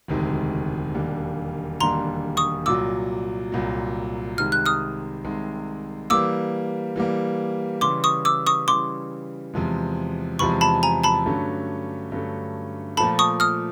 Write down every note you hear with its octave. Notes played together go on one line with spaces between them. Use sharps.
E1 D2 C3 D#3 G#3
E1 D#2 D3 G3 A#3
E1 D#2 D3 G3 A#3 A#5 C6
C#6 D#6
C2 A#2 F#3 D6 E6
C2 A#2 F#3
C2 C3 D#3 G#3 F6
F#6
D#6 F6
C2 C3 D#3 G#3
E3 G3 A#3 D6 E6
E3 G3 A#3
C#3 E3 G3 C6 D6
C#6 D#6
D6 E6
C#6 D#6
C#3 E3 G3 C6 D6
E2 C3 F3 G#3
E2 C3 F3 G#3 B5 C#6
A5 B5
G#5 A#5
A5 B5
G2 D3 F#3 A3 C#4
G2 D3 F#3 A3 C#4
A#2 F3 A3 A5 B5
C#6 D#6
D#6 F6